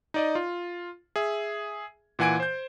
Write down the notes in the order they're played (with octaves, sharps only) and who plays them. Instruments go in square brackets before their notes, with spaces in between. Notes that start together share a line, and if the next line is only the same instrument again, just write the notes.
[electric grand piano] D#4 D5 D#5
F4
G#4 E5
A#2 E3 F#5 G#5 G#6 D7
C5 G6